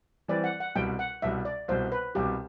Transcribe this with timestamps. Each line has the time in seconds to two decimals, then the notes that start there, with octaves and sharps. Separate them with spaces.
0.28 E3 G3 C4 E4 B4 D5
0.44 F#5
0.60 F#5
0.75 C2 B2 G3 G5
0.99 F#5
1.22 C2 B2 G3 E5
1.45 D5
1.68 C2 B2 G3 C5
1.92 B4
2.15 C2 B2 G3 G4